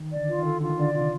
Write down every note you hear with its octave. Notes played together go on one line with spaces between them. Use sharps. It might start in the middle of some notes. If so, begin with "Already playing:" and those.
Already playing: D#3
D5
D3
F4
D#3
A4
D3 F4
D#3
D3 D5
C3 F4